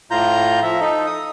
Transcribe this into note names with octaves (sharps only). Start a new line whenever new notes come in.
A2 F4 A#5 G6
F3 E5
D#4 A4
D#6